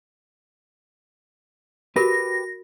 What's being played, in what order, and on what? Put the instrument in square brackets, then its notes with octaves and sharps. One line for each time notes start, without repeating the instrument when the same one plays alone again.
[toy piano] F#4 A#4 B5 [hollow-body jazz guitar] G4 B4 [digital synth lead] A#6